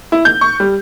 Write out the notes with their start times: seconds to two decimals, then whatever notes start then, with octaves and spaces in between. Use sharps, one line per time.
0.12 E4
0.25 G6
0.41 C#6
0.60 G3